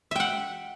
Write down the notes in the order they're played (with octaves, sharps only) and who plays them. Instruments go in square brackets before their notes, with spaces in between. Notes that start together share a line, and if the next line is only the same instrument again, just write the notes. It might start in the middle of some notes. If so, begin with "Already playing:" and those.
[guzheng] E5
G5
F#5